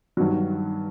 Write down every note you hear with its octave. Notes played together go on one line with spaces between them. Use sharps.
G2 D#3 F#3